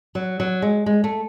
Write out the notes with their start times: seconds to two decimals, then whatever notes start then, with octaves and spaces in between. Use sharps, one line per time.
0.15 F#3
0.40 F#3
0.62 G#3
0.86 G#3
1.04 A3